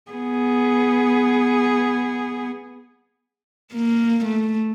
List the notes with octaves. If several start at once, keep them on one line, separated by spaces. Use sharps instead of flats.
B3 G#4
A#3
A3